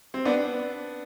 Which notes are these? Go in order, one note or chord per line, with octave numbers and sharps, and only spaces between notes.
C4
B3 D4